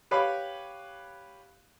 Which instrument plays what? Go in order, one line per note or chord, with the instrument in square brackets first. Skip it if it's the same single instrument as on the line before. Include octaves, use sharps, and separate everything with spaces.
[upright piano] G4 B4 C#5 F5 B5 D6